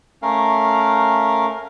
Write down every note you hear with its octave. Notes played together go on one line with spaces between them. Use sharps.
A3 C#4 A#4 F5